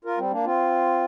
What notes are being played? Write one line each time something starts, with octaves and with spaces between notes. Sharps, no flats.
F4 A#4
G3 C4
A#3 D4
C4 F4